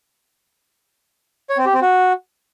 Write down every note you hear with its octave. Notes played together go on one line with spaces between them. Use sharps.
C#5
C4
G4
C4
F#4